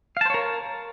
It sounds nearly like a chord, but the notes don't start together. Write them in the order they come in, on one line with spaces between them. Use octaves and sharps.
F5 A5 C5 C#5 A#4